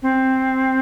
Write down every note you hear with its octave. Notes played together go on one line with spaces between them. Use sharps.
C4